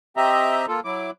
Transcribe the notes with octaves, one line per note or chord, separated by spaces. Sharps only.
C4 G4 D#5 E5 A#5
A#3 F4 A4
F#3 E4 D6